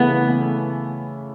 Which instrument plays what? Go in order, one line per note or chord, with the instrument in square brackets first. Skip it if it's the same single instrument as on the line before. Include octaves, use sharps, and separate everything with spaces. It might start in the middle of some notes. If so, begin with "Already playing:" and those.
Already playing: [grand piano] C#3 E3 A3 E4 [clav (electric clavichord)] B3